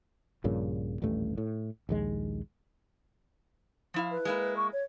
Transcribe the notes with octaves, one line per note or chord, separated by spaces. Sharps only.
A#1 G2 A#2 C#3
D#1 A1 G2 A3
A2
A#1 D#2 G#3
F3 E4 F5
B4
G#3 A#3 E4
C#6
C#5